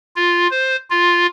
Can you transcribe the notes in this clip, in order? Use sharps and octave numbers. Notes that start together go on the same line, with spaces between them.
F4
C5
F4